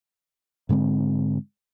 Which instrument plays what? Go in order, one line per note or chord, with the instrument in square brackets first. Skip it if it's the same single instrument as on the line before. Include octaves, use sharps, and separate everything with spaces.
[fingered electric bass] G#2 D3 G#3 C4